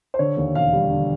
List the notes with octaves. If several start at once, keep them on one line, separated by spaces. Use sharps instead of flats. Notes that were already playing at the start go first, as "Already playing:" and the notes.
C5
D3 C#5
D#2
E1 F5
G3
D3